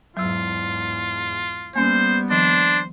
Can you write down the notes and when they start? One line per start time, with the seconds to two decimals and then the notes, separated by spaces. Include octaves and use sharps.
0.17 E2 G#2 F#3 F4 E6
1.75 G3 A#3 B3 C#4 C5
2.30 D#3 F3 D4 C5